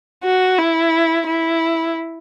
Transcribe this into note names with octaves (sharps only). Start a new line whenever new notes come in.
F#4
E4
E4